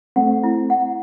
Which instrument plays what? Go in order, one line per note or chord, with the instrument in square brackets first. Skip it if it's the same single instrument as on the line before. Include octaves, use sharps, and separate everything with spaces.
[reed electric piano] A3 C4 [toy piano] F#5
[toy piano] E4
F#5